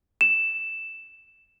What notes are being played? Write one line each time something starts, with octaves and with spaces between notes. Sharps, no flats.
E7